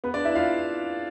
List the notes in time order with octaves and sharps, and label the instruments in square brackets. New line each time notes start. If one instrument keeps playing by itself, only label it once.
[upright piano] B3 B4
D4 D5
E4 E5
F4 F5